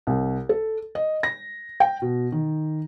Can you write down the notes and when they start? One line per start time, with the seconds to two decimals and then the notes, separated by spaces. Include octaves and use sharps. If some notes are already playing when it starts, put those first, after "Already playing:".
0.07 C2
0.49 A4
0.95 D#5
1.23 A#6
1.80 G5
2.02 B2
2.32 D#3